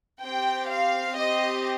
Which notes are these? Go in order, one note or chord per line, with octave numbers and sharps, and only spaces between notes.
C4 G4 G5
F5
C4 G4 D#5